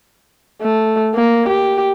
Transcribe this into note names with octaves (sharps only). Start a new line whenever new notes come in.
A3
A#3
G4